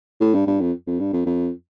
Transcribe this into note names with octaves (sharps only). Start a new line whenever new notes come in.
A2
G2
G2
F2
F2
G2
F2
F2